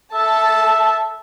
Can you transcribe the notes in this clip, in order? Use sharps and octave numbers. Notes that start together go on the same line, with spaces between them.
A4 E5 A5